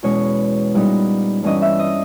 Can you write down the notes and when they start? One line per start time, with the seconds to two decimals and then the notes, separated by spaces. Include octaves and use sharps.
0.03 E2 B2 G#3 C#4 C#5
0.74 A#2 G3 B3 D#4
1.43 G2 E3 G3 C#4 D#5
1.62 E5
1.79 D#5